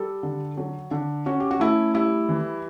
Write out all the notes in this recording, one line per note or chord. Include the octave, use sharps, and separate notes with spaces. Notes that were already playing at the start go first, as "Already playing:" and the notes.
Already playing: G3 A4
D3
F#3
D3
C#4 F#4
G4
F#4
A3 E4
G3 E4
E3